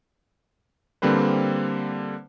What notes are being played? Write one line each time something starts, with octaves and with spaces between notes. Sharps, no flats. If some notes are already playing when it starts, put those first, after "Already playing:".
D3 G3 A#3 C4 B4 C5